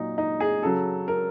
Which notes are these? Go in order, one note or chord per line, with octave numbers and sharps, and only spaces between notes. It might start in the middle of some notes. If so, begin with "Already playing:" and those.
Already playing: A#2 F#3 D#4
D#4
G#4
C#3 F#3 A4
A#4